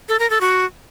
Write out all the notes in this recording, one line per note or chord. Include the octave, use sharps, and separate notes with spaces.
A4
A#4
A4
F#4